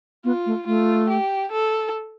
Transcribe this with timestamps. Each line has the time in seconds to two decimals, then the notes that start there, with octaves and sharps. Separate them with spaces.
0.24 B3 F4
0.46 A3
0.66 A3 F4
1.10 G4
1.52 A4